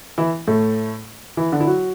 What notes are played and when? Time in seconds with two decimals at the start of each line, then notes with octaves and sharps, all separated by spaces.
0.18 E3 E4
0.47 A2 A3
1.37 E3 E4
1.52 D3 D4
1.60 E4
1.67 F#3 F#4